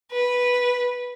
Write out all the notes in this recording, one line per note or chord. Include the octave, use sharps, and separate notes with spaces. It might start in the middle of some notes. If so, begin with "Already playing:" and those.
B4